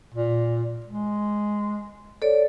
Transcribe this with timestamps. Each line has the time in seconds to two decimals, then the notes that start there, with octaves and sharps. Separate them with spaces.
0.14 A#2
0.86 G#3
2.22 A4 C#5 D5